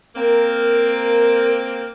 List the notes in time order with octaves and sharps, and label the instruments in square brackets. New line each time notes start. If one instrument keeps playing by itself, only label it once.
[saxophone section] A#3 C4 [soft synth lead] A#4